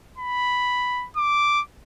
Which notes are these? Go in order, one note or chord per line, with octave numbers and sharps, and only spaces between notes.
B5
D6